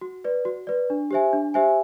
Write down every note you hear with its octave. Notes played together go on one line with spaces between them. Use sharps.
F#4
B4 D5
F#4
B4 D5
D4
G4 C5 E5 G#5
D4
G4 C5 E5 G#5